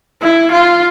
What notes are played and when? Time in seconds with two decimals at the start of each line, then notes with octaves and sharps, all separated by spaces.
0.22 E4
0.52 F4